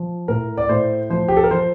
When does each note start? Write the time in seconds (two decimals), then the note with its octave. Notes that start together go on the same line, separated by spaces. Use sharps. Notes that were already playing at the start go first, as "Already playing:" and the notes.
Already playing: F3
0.28 A2 A#4
0.57 D5
0.69 A2 C5
1.10 F3 C5
1.28 G4
1.37 A4
1.44 A#4
1.51 F3 C5